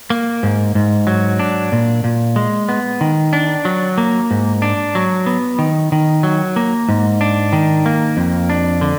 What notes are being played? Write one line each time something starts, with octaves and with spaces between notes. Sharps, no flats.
A#3
G#2
G#2
F#3
D4
A#2
A#2
G#3
B3
D#3
D4
F#3
A#3
G#2
D4
F#3
B3
D#3
D#3
F#3
A#3
G#2
D4
D#3
A#3
F2
D4
D3